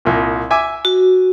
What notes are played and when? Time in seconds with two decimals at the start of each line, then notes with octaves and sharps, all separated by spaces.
0.05 C2 A#2
0.51 E5 G#5 D6
0.85 F#4